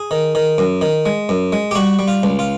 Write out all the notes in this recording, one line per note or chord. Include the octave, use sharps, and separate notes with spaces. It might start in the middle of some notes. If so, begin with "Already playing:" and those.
Already playing: G#4
D#3
D#3
F#2
D#3
G#3
F#2
G#3
G4
G3 F#4
G3
F4
C#2
F4